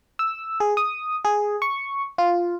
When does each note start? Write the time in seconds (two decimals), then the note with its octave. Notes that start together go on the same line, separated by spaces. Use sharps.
0.19 E6
0.60 G#4
0.77 D#6
1.25 G#4
1.62 C#6
2.18 F4